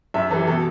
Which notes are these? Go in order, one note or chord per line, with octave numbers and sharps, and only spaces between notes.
F#2 E5
E3 G3 A4
B2 A4